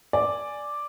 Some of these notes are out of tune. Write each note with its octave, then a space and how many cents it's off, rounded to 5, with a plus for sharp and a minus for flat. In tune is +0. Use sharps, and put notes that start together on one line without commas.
D5 +0 G#5 +0